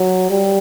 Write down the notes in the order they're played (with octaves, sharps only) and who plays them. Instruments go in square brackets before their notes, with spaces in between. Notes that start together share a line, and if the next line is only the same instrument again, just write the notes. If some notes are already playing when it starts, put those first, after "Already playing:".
Already playing: [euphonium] F#3
G3